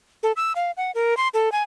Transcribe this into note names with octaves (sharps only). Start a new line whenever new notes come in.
A4
E6
F5
F#5
A#4
C6
A4
G#5